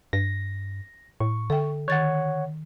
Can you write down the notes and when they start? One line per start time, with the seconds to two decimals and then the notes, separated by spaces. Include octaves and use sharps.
0.13 G2 A#6
1.20 A2 C#6
1.50 D3 A4 E5 G5
1.88 D#3 C#5 F#5 A6